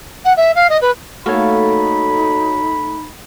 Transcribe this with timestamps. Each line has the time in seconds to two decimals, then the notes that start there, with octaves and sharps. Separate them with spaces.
0.24 F#5
0.37 E5
0.55 F5
0.69 D#5
0.81 B4
1.26 A3 A#3 D#4 F#4 A4 C#5 B5